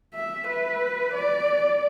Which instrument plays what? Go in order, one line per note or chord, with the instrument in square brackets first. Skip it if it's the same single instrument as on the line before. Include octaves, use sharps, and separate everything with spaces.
[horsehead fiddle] E5
B4
D5